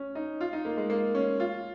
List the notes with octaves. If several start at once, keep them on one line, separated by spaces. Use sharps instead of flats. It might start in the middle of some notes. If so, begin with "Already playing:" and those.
Already playing: C#4
D#4
F4
D#4
A#3
G#3
A#3
C#4
F4